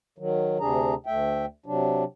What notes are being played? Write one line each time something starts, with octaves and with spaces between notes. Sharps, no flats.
D#3 F#3
D2 C3 D4 G#4 A#5
D2 A3 E5 G5
C3 F#3 D4